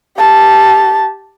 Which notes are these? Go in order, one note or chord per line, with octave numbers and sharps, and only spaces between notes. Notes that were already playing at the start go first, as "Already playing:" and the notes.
G4 A5